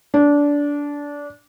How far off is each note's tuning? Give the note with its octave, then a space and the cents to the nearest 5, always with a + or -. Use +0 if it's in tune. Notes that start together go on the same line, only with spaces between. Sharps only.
D4 -20